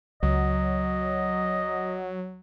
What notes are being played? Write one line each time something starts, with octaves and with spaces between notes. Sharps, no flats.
C#2 F#3 D#5